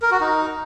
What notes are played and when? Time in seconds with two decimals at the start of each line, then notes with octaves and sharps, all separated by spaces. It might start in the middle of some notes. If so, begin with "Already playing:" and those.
0.02 A#4
0.11 F#4
0.20 D#4